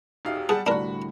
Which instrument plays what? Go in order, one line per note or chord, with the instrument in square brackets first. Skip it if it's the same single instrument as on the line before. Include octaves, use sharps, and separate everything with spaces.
[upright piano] E1 B2 F5 [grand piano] D#4 G4 E5
[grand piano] G4
[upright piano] G3 F#5 A5 [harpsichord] G#4
[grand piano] C2 A2 D3 [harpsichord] D4 A#4 [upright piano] F#4 B5